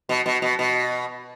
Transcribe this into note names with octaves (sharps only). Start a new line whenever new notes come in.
B2
B2
B2
B2